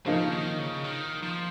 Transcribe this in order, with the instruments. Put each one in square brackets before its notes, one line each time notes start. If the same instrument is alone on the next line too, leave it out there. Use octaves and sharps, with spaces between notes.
[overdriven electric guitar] C#3 [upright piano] F3 A#3 D#4
[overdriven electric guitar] D#3
C#3
D#3
F3